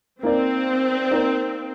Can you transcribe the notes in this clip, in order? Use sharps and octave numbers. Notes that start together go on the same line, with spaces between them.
A#3 C4 D#4 A#4 D5
A#3 D#4 A#4 D5